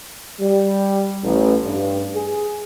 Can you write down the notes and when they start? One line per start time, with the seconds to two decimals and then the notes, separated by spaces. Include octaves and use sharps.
0.40 G3
1.23 A1
1.63 G2
2.14 G#4